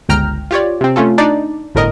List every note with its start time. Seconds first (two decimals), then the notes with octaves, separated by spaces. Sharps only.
0.09 G1 C#2 G5 A#5 F6
0.51 F4 G4 C#5 D5
0.81 C3 C4
0.96 A3 C#4 F4 A4
1.18 D4 D#4 D5
1.75 G1 A2 A#4 D#5